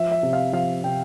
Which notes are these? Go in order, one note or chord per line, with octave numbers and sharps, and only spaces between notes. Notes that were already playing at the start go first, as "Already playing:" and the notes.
Already playing: F3 E5
E5
C3
F5
F3 F5
C3 G5